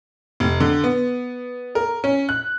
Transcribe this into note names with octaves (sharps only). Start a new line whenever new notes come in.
F1
D3
B3
A#4
C#4
F#6